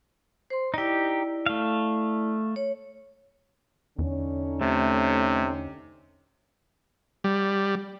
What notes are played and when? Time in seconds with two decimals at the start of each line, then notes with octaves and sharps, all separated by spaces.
0.50 C5 C6
0.74 D#4 E4 G4 D5
1.46 A3 F5
2.56 C#5
3.99 E2 D3 C#4 D#4
4.61 C3 A3
7.24 G3